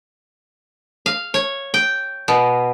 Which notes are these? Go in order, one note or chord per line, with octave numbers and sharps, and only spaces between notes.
F5
C#5
G5
B2